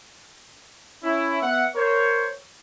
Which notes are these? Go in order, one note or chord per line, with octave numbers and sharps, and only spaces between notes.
C#4 E4
B3 E5 F#5
A#4 C5 C#5